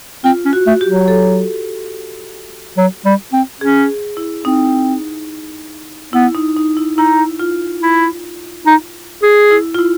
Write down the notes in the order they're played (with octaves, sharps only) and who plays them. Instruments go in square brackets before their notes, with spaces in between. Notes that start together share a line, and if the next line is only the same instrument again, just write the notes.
[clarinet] C4 [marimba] F4
[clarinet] C#4
[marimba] F#4
[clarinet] A3
[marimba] G4
[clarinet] F#3
[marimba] A4
[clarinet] F#3
G3
C4
[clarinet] C#4 [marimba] G#4
[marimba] E4
[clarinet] C4 [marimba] D#4
[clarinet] B3 [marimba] E4
[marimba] D#4
D#4
E4
[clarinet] D#4 [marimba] E4
[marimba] F4
[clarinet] E4
D#4
G#4
[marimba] E4
F4
E4